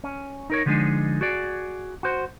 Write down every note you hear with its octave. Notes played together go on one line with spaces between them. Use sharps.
C#4
D#4 A#4 C#5
D3 F3 G3 G#3 D4 D#4
F#4 G#4 D5
F#4 C5